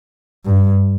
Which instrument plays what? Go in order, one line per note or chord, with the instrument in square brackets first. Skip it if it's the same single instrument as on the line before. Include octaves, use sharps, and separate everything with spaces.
[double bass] G2